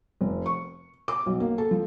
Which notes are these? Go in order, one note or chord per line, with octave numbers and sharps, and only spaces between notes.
F1
C#6
D6
B1
A#3
A4
F3